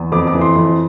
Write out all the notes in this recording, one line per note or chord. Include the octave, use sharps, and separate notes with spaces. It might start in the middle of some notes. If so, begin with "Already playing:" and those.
Already playing: E2
F2 D6
D6
E3
C6
F2